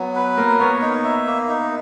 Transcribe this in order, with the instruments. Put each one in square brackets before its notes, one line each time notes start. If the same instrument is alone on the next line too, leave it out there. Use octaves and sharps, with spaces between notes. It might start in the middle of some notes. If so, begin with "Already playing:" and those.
Already playing: [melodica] F#3 [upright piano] B3
[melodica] B4
[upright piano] A#3 [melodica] A#4
[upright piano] B3 [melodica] C#5
[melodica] D#4
E5
A#3
D#4